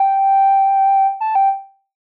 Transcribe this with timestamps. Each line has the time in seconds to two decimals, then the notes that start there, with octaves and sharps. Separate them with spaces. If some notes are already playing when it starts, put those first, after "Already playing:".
Already playing: G5
1.21 A5
1.35 G5